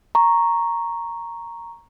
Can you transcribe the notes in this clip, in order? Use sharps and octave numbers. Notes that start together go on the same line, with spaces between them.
A#5 C#6